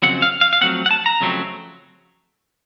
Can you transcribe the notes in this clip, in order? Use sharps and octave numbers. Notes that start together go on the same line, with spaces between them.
F2 C#3 F#3 C4 F#5
F5
F5
F5
F2 C#3 F#3 A3 C4 F#5
F#5
A5
A#5
F2 C#3 F#3 A3 C4